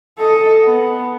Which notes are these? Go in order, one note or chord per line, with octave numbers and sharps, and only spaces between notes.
A4 D#5
B3